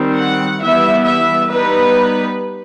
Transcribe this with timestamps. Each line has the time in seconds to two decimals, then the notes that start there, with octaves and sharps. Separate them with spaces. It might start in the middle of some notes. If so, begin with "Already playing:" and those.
Already playing: D#3 G3 C4
0.16 F#5
0.60 E3 G3 B3 E4 E5
1.06 E5
1.50 G3 B3 D#4 B4